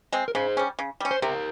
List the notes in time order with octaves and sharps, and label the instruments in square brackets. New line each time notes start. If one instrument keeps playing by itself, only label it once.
[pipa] G#3 C4
[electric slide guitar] A#4
[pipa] C#3 [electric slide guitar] G#4 C5
[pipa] G3 C#4
C#3
G3 C#4
[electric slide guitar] C5
[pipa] C3 [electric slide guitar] G4 A#4